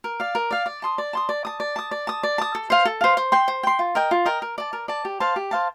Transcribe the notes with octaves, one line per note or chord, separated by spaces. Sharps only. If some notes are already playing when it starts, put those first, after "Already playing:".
A#4
D5 F5
A#4
D5 F5
D5
A5 C6 D#6
D5
A5 C6 D#6
D5
A5 D#6
D5
A5 D#6
D5
A5 D#6
D5
A5 D#6
A4
C5 F5
A4
C5 F5
C5
G5 C6
C5
G5 C6
F4
A#4 D#5 G5
F4
A#4 D#5 G5
A#4
D5 A5
A#4
D5 A5
G4
C5 F5 A5
G4
C5 F5 A5